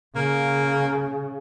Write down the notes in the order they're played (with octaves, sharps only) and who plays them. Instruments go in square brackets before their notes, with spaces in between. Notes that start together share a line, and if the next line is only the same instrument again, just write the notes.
[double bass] C#3 [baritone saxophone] A#3